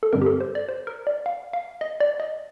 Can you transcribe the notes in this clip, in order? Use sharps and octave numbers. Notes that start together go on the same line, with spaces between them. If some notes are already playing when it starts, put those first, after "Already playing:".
A4
G2 D3 G3 C4 A#4
G4
A4
C5
D5
C5
A#4
D5
F5
F5
D#5
D5
D#5